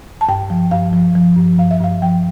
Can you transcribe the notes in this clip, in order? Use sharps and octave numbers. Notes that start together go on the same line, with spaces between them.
A5
G2 G5
F3
G2 F5
F3
F3
G2
G2 F5
E5
G2 F5
F3 G5